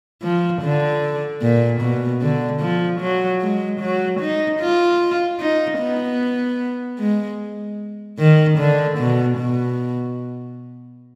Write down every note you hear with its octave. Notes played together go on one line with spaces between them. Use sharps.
F3
D3
A#2
B2
D3
F3
F#3
G#3
F#3
D#4
F4
D#4
B3
G#3
D#3
D3
B2
B2